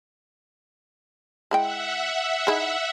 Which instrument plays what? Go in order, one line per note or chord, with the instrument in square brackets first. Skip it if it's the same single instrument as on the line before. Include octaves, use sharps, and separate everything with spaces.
[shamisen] G#3 E4 G5 [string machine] E5 F#5
[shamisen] D#4 E4 G#4